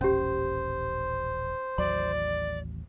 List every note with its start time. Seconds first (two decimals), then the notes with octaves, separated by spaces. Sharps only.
0.01 D#1 A1 C#4 G4 C5
1.78 A1 D#2 F#3 D5 C6